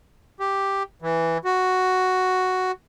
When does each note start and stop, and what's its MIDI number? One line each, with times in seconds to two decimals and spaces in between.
0.40 0.83 67
1.02 1.38 52
1.45 2.72 66